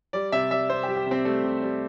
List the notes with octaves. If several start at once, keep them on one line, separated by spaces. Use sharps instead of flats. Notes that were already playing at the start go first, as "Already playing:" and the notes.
G3 D5
C3 E5
G3 E5
C3 C5
G4
G3
G4
C3 C4
G3 A3
C3
G3